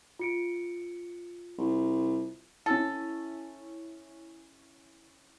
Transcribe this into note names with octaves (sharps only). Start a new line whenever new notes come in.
F4 C#7 D7
C2
C#4 E4 A4